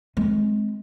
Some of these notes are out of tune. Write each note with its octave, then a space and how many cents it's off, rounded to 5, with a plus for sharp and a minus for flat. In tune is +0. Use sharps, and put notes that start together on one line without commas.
G#3 +25 C4 +0